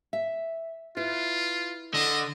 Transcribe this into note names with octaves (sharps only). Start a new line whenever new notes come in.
E5
E4 F4 B4
D3 D#5